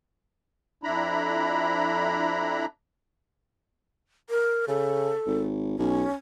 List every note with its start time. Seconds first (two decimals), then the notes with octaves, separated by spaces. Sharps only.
0.83 F2 D4 E4 A#5 B5
4.30 A#4
4.68 C#3 A4
5.27 G#1
5.79 B1 C#4